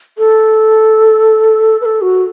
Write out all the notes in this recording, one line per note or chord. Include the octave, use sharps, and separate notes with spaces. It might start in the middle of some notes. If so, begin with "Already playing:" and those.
A4
B4
A4
F#4